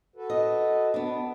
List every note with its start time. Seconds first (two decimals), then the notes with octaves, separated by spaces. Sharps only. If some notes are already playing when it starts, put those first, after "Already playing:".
0.16 F#4 A4 B4
0.30 D#5
0.94 B3 D4